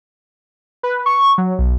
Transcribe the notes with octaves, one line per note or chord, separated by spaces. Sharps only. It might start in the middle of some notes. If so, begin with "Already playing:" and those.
B4
C#6
F#3
B1